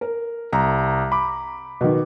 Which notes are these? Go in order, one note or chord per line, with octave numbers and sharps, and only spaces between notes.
A#4
C2 A#5
B5 D6
B2 D#3